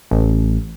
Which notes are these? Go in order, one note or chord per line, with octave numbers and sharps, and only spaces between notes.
A1